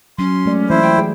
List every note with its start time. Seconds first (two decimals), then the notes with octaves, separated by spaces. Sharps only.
0.19 F#3 C#4 C6
0.45 G#3 A3 D5
0.70 E3 E4 F4 C5
0.82 G5
0.98 G#4